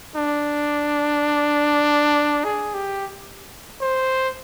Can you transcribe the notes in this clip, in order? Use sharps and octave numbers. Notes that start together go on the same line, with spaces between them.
D4
G#4
G4
C5